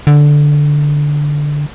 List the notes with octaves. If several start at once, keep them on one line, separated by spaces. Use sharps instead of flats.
D3